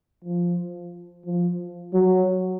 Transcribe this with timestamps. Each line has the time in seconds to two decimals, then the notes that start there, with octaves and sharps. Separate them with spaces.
0.24 F3
1.26 F3
1.94 F#3